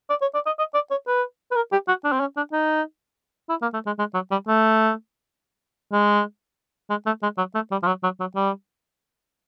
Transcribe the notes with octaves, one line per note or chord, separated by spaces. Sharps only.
D5
C#5
D5
D#5
D#5
D5
C#5
B4
B4
A#4
G4
F#4
D4
C4
C#4
D4
D#4
E4
A#3
A3
G#3
G#3
F#3
G3
A3
G#3
G#3
A3
G#3
F#3
A3
G3
F3
F#3
F#3
F#3
G3